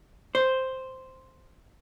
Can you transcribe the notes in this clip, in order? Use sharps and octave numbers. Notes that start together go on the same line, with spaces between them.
C5